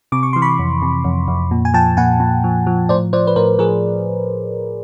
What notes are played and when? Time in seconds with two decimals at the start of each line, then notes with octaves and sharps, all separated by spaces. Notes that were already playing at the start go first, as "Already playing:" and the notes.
0.12 C3 D6
0.23 C#6
0.33 E3 C6
0.42 B5 C#6
0.59 F2
0.82 C3
1.04 F2
1.28 F2
1.51 A#2
1.65 G#5
1.74 F3 G5 A5
1.97 A#2 F#5 G#5
2.20 A#2
2.44 F3
2.67 F3
2.89 A2 C5 D5
3.13 F3 C5 D5
3.27 B4
3.36 A2 A#4 C5
3.59 F3 G#4 A#4